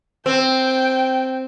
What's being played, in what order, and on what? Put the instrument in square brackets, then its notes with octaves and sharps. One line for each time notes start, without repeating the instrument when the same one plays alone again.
[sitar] C4 [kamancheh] G5